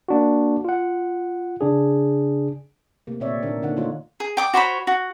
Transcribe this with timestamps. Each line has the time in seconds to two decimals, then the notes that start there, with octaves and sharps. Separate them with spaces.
0.08 A#3 D4 F#4
0.65 F4 F#5
1.61 C#3 D4 G#4
3.07 C3 A3 A#3
3.20 A#2 D3 C4 C#5 D5 E5
3.43 A#2 D#3 B3 D4 A#4
3.62 D3 D#3 A#3 D#4 F#5
3.77 D#3 A3 D#4 F4 C#5
4.20 G#4
4.37 G5 D6 D#6
4.54 F#4 C5 C#5 B5
4.87 F#4